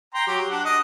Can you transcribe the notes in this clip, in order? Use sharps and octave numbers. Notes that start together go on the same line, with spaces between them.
G5 A#5 C6
F#3 G4
D4 F#5
D#5